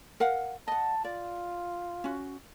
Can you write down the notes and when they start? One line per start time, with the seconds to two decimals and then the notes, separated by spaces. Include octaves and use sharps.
0.20 A#4 F5 F#5
0.68 D#5 F#5 A5
1.04 F4 D5
2.04 C#4 F#4